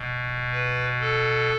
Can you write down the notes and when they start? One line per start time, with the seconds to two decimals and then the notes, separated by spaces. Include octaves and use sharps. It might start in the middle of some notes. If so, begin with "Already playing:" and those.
Already playing: B2
0.52 B4
1.00 A4